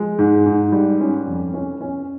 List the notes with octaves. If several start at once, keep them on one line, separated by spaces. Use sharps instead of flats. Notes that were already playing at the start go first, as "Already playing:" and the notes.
Already playing: F3 G#3
G#2
G#2
G3
C#4
F2
C#4
C#4